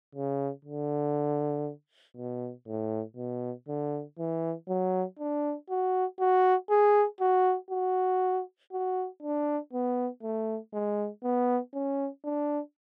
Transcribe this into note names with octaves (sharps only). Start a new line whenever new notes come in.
C#3
D3
B2
A2
B2
D3
E3
F#3
D4
F#4
F#4
G#4
F#4
F#4
F#4
D4
B3
A3
G#3
B3
C#4
D4